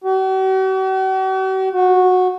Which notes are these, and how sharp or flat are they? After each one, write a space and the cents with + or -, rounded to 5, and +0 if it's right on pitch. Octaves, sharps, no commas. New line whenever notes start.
F#4 +45
F#4 -15